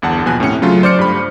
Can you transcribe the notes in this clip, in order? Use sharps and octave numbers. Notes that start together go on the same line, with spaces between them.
G1 E2 F#5 A5
D#2 B2 F3 G#5 F#6
A2 C3 C#4 C#7
C#3 F#3 A3 F4
C5 D5 D6 F6 C#7
G2 G3 B5